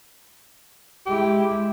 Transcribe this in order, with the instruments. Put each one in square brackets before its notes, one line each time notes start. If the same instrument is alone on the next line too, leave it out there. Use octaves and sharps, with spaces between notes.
[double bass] G#3 E4 [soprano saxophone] G4